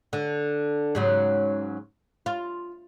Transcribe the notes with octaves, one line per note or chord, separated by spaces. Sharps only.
D3
G#2 C#3 F#3
F4